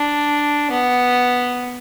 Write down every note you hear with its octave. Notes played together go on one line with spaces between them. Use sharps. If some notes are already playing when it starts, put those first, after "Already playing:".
Already playing: D4
B3